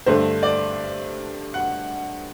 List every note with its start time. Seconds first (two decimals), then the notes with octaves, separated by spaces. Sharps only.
0.06 G2 D3 A3 C5
0.43 D5
1.54 F#5